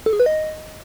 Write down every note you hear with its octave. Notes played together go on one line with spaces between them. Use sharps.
A4
G#4
B4
D#5